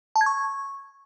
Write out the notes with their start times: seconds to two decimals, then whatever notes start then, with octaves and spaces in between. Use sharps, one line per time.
0.16 A5
0.21 G#6
0.26 C#6